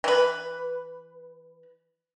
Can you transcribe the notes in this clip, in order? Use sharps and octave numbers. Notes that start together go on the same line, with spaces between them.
E3 B4